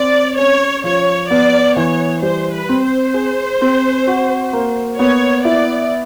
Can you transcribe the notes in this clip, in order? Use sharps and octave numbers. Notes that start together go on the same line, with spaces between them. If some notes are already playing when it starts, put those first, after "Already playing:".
Already playing: C4 D5
C#4 C#5
F3 C#5
B3 D5
E3 C#5
G3 C5
B4
C4
C5
G#4
C4
F#4
A#3
B3 C#5
E4 D5